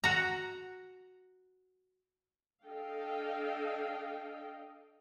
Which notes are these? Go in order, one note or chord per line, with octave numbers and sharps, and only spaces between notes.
F#4 A#5
D4 A4 D#5 F5 G5